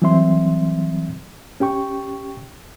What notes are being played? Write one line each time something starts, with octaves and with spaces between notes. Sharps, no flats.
E3 F#3 G3 C4 E5 C6
C#4 G4 G5 C#6